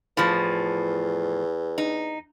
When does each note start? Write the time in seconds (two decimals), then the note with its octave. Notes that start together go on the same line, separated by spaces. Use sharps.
0.17 E2 A2 F3
1.78 D#4